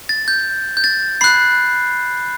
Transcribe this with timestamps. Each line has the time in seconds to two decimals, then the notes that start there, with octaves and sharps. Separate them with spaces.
0.09 A6
0.28 G6
0.77 G6
0.84 A6
1.21 B5 F#6 C7